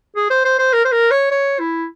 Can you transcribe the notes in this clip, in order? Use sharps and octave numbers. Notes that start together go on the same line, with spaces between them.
G#4
C5
C5
C5
A#4
C5
A#4
C#5
C#5
E4